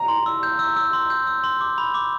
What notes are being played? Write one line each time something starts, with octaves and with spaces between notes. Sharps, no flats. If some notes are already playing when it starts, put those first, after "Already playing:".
Already playing: A#5
C6
E6
G6
E6
E6
C6
G6
E6
C6
D6
B5
D6